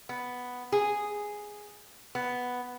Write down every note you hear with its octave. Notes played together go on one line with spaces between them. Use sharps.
B3
G#4
B3